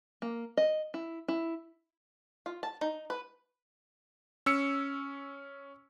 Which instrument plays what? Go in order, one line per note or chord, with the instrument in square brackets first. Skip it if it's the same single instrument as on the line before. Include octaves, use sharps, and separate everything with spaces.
[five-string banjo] A#3
D#5
E4
E4
F4
A5
D#4
B4
[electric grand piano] C#4 E6 C#7